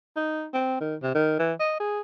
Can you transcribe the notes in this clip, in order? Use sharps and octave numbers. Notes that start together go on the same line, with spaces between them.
D#4
C4
D#3
C3
D#3
E3
D#5
G#4